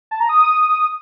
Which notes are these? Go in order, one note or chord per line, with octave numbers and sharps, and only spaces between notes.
A5
A#5
D#6